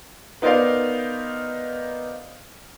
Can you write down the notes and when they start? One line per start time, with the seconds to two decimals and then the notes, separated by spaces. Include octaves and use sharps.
0.42 B3 D#4 A#4 C5 D5 F5